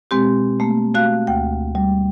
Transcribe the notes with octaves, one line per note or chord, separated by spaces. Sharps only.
B2 G#3 C4 G4
A3 A#3
A3 F#4 F5 F#6
D2 G5
G3